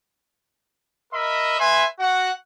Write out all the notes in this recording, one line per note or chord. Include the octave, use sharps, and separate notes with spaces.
A#4 D#5 E5 B5
B4 E5 G#5 C6
F#4 F#5